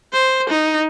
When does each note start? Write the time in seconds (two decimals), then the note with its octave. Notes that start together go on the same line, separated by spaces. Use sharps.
0.13 C5
0.49 D#4